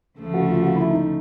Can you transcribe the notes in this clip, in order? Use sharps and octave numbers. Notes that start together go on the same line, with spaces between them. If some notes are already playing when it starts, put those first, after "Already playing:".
D2 C#3 F3 A3
F#4
F4
F#4
E4
D#4